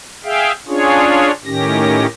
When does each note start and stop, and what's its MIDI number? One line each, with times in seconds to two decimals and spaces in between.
0.24 0.52 68
0.24 0.52 76
0.24 0.52 77
0.24 0.52 79
0.68 1.31 61
0.68 1.31 62
0.68 1.31 65
0.68 1.31 68
0.68 1.31 73
1.45 2.06 45
1.45 2.06 51
1.45 2.06 61
1.45 2.06 67
1.45 2.06 94